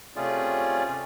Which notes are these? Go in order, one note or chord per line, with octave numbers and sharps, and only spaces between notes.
C3 A3 C#4 F4 G#4 D5